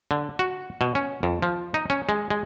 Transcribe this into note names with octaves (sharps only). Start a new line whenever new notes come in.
D3
F#4
B2
C#4
F2
F3
D#4
C#4
G#3
G#3